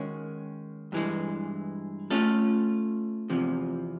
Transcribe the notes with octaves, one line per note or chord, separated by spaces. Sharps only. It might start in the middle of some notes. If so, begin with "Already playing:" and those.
Already playing: D#3 G#3 C#4 F#4
G2 E3 G#3
A3 C#4 F4 A4
E2 C3 F3